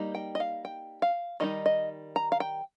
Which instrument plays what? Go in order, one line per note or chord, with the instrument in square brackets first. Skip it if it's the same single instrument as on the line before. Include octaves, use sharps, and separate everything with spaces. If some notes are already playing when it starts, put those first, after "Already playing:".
Already playing: [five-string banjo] G3 A#3 D#4
G5
D#5
F5
G5
F5
D#3 G3 D#4 D#5
D#5
A#5
F5
G5